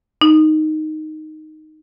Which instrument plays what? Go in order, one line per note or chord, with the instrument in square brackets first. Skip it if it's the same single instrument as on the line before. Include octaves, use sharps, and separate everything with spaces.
[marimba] D#4